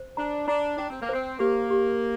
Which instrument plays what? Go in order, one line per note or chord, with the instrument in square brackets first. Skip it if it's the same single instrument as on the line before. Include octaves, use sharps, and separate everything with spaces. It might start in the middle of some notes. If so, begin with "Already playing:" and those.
Already playing: [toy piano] C5
[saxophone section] D4 [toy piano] A#5
[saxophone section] D4 [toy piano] A#5
[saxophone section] D4 [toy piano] G5
[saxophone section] C4
A#3
[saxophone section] C4 [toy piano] C5
[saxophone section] A#3 [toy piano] G4
[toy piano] G4